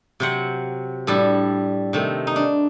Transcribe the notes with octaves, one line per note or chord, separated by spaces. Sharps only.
C3 F#3 C4 F#5
A2 G3 D4 A4
C3 D#3 A3
D#4
D4